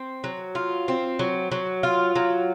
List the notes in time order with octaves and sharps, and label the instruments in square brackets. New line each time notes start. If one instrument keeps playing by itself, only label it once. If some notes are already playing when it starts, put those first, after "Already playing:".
Already playing: [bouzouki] C4
F#3
F4
C4
F#3
F#3
F4
F#3